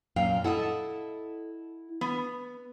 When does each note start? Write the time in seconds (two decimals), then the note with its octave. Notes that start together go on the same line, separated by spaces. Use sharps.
0.16 F#2 A#2 F5 G5
0.44 E4 A4 D#5 F#5
2.01 B3